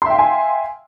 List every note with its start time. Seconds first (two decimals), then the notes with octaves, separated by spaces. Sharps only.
0.02 C6
0.06 E5
0.10 G5
0.14 F5
0.19 G#5